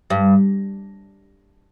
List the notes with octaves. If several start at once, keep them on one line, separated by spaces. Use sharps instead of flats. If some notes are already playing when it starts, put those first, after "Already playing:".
G2